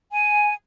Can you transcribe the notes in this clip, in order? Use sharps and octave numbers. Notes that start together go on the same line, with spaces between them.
G#5